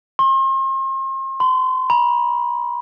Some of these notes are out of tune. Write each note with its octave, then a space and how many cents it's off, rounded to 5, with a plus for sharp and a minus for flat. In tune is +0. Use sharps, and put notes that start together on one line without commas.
C6 +40
C6 -35
B5 -45